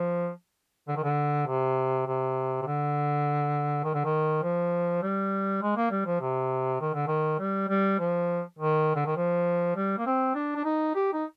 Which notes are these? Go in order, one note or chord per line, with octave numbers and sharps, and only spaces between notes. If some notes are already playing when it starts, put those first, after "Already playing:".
Already playing: F3
D3
D#3
D3
C3
C3
C3
D3
D#3
D3
D#3
F3
G3
G#3
A#3
G3
F3
C3
D#3
D3
D#3
G3
G3
F3
D#3
D3
D#3
F3
G3
A#3
C4
D4
D4
D#4
G4
D#4